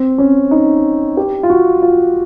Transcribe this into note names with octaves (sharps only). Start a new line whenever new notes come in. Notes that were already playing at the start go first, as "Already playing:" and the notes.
Already playing: C4
C#4
D#4
G4
F4
F#4
F4